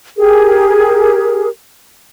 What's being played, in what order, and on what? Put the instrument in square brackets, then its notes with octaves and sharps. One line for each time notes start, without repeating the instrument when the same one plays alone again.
[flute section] G4 G#4 A#4